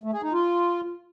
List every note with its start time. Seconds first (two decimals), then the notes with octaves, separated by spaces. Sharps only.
0.04 A3
0.13 G#4
0.23 D#4
0.33 F4